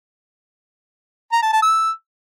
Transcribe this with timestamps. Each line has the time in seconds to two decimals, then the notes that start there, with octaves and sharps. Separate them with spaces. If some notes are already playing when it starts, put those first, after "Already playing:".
1.32 A#5
1.42 A5
1.52 A5
1.62 E6